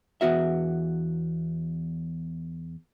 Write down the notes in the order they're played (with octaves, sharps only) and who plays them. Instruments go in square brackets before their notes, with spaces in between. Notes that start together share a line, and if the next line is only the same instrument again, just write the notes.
[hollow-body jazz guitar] E2 B3 F#4 E5